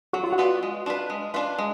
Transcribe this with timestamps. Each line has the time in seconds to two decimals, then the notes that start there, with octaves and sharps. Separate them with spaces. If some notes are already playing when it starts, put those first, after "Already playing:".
0.13 F#3 F#4
0.24 F4
0.33 F#4
0.38 B3 F4 B4 D5
0.63 G#3
0.86 D4 F4 B4
1.10 G#3
1.34 D4 F4 B4
1.59 G#3